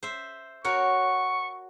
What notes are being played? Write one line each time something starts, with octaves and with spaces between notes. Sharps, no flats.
C5 E5
F#4 A#4 C#5 C#6